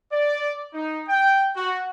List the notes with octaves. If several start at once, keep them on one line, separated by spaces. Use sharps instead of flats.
D5
D#4
G5
F#4